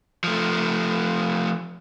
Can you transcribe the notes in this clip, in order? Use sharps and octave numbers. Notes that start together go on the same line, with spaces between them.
F3 A3